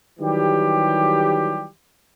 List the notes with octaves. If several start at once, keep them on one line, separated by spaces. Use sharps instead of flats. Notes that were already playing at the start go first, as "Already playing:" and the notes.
D#3 E3 F#3 G3 G4